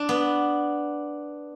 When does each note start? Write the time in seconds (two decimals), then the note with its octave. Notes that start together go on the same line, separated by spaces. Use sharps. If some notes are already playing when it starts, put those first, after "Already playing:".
Already playing: D4
0.09 B3